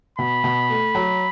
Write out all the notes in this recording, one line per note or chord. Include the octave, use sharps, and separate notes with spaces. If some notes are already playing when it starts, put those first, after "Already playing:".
B2 B5
B2
A3
F#3